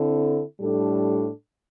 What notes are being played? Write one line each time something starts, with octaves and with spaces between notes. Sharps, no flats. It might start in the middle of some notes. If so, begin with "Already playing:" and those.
Already playing: D3 C4 E4 A4
A2 G3 D4 A4